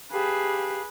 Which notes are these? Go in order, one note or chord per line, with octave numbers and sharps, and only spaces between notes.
G4 G#4 B4 F5 A5